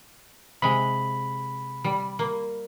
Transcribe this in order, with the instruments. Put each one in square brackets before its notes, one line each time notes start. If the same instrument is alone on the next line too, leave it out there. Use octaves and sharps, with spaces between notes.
[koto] C3 G#3 [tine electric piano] B5
[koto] G3
A#3